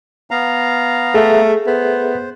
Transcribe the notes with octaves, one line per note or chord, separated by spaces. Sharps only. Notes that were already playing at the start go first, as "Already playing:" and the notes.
B3 F5 A#5
A3 G#4 A4 E5
B3 C5